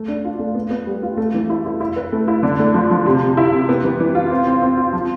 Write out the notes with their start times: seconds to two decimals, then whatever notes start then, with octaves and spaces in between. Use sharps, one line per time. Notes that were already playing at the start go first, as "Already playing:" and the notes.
Already playing: A3
0.08 D4
0.24 F4
0.39 A3
0.55 B3
0.70 B3
0.87 G3
1.03 F4
1.17 A3
1.34 E3
1.50 E4
1.65 E4
1.80 E4
1.96 B4
2.12 A3
2.28 E4
2.43 D3
2.59 A3
2.74 F3
2.90 F3
3.06 C3
3.21 C3
3.37 E4
3.52 C3
3.69 B3
3.84 E3
4.00 E3
4.15 F4
4.31 C4
4.47 C4
4.62 C4
4.77 F4
4.93 F3